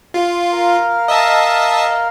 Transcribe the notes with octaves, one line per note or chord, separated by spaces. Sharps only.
F4
A#4 F5
D#5 E5 A5